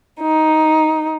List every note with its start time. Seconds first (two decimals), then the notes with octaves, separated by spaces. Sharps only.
0.19 D#4